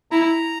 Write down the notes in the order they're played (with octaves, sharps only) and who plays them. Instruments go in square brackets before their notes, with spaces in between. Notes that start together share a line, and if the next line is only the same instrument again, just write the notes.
[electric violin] E4 [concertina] A#5